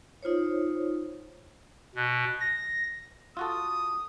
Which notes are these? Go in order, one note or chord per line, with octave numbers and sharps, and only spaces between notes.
D#4 F4 C5 C#5
B2
A#6
F4 F#4 A4 D#6